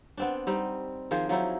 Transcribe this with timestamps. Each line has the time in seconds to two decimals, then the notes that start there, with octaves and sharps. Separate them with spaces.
0.17 B3 C4 D4
0.47 G3 C4 D#4
1.11 D#3 F3 G#4 C5
1.29 F3 F#3 D#4 E4